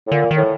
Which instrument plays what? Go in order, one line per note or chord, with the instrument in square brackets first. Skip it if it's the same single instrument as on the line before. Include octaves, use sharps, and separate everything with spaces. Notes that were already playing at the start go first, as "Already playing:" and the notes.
[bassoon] A2
[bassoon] A#2 [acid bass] D3
[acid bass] D#3
[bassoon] A2